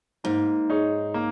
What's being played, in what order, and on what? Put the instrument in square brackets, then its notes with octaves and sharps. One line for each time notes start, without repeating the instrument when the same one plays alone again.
[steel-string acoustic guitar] G#2 [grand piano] A#3
[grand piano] D#4 G#4 C#5
A#3